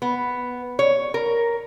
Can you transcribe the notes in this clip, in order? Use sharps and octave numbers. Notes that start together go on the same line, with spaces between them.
B3
C#5
A#4